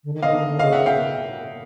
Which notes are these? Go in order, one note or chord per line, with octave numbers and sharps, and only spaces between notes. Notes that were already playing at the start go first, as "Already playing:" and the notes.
D3
D#3
D3 D#5 F5
D#3
D3
C#3 D#5 F5
E5 F#5
F5 G5